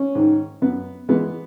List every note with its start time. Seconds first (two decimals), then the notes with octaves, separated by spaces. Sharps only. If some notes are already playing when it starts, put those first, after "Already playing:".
Already playing: C#4
0.15 G#2 D#3
0.62 F#2 B3
1.09 E3 G#3 B3